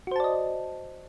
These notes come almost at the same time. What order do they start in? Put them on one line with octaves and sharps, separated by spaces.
F#4 C5 A5 D5 D#5